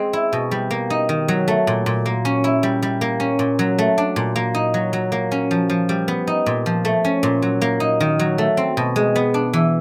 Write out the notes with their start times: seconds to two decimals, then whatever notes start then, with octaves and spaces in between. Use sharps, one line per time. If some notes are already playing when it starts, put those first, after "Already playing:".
Already playing: G#3 C4
0.13 E4
0.33 B2
0.51 G3
0.71 A#3
0.90 D#4
1.09 D#3
1.28 F#3
1.48 A3
1.67 A#2
1.86 A#2
2.06 A#3
2.25 C#4
2.44 E4
2.63 G3
2.82 G3
3.01 A#3
3.20 C#4
3.39 A#2
3.59 F#3
3.78 A3
3.98 D4
4.16 A#2
4.36 A#3
4.55 D#4
4.74 F#3
4.93 F#3
5.12 A#3
5.32 C#4
5.51 F3
5.70 F3
5.89 G3
6.08 B3
6.27 D#4
6.46 A#2
6.66 F3
6.85 A3
7.05 C#4
7.23 A#2
7.42 F#3
7.61 A#3
7.80 D#4
8.00 D#3
8.19 F#3
8.38 A3
8.57 C4
8.77 B2
8.96 G#3
9.16 B3
9.34 D4
9.53 E3